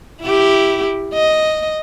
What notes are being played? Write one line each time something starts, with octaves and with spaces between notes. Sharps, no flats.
E4 G4
D#5